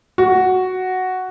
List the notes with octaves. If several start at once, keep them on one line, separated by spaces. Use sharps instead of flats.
F#4